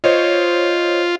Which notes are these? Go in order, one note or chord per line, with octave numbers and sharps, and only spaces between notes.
F4 C5 C#5 D#5